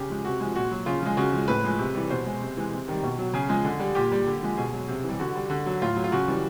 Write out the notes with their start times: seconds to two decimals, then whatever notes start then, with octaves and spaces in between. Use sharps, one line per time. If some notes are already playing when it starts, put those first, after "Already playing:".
Already playing: C#3 G4
0.09 F3 G#3
0.25 C3 F#4
0.40 F3 G#3
0.55 A#2 F#4
0.71 F#3
0.86 C#3 F4
1.02 F3 G#3
1.17 C#3 F#4
1.32 F3 G#3
1.48 A2 B4
1.64 F3 G#3
1.79 C3
1.95 E3 G3
2.10 B2 C5
2.26 G#3
2.41 C3
2.57 E3 G#3
2.73 C3
2.88 D#3 G3
3.03 B2
3.19 F#3
3.34 C#3 G#4
3.49 F3 G#3
3.65 D3
3.80 G3
3.95 A#2 G4
4.12 G3
4.27 D3
4.43 F3 G#3
4.57 B2 G#4
4.73 F#3
4.88 C3
5.04 E3
5.09 G3
5.19 D3 F#4
5.35 G3
5.50 D3
5.66 F#3
5.82 A2 F4
5.96 F#3
6.04 F4
6.12 C#3 F#4
6.28 E3 G3